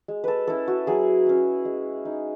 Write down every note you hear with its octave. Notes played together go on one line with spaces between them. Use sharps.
G#3
A4 B4
C#4 E4 A4
F#4
F#3 G#4
C#4 E4
G#3
D#4